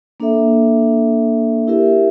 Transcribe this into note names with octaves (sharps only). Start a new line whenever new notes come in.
A#3 D4 A4 E5
E4 G4 A#4 E5